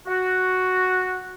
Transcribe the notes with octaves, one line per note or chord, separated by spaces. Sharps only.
F#4